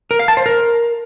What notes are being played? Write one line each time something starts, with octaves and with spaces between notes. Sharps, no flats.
A#4
F5
A5
C5
A#4